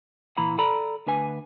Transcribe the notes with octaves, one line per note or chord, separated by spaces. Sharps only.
A#2 E3 E4 A#5 B5
A4 D5 A#5 B5
D2 D4 B4 G#5